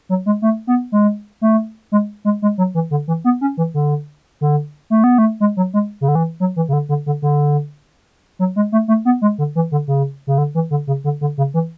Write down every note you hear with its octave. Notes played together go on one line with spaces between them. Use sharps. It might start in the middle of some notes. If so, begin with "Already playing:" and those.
F#3
G#3
A3
B3
G#3
A3
G#3
G#3
G#3
F#3
E3
D3
E3
B3
C#4
E3
D3
D3
A3
B3
A3
G#3
F#3
G#3
C#3
D3
E3
F#3
E3
C#3
D3
D3
D3
D3
F#3
G#3
A3
A3
B3
G#3
D3
E3
D3
C#3
C#3
D3
E3
D3
C#3
D3
D3
C#3
E3